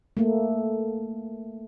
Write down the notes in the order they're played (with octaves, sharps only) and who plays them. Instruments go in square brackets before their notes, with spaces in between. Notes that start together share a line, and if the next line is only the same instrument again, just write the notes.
[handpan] A3 A#3